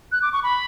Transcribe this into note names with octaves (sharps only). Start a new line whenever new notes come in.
F#6
D6
C#6
B5